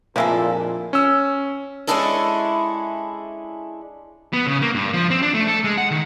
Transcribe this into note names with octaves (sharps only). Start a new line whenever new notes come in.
F2 A#2 F3 G#3 A#3 D4 E4 A4
C#4 E6
G#3 C#4 D4 E4 G#4 A4
B3
C#3
A#3
G2
F3
C4
D4
A3
A4
G#3
F#5
D#3